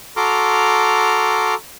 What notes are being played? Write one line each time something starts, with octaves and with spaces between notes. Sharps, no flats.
F#4 A4 A#5 C6 D6 F6